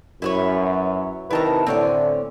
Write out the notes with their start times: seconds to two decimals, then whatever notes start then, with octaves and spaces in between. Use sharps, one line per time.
0.22 F#2 E4 B4 C#5
1.31 C3 D#3 E4 B4 A5 A#5
1.67 A2 D3 C4 C#4 D5